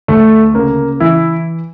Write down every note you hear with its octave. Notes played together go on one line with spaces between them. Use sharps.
D2 A3
C#3 A#3
E3 E4